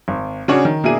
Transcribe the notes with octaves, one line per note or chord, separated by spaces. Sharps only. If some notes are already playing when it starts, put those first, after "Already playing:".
G#1
C#3 C#4 D4 F#4 G#4 C#5
D#3
B2 A#3 D4 E4 G#4 D#7